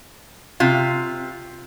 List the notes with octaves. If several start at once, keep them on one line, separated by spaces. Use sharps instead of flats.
C3 F4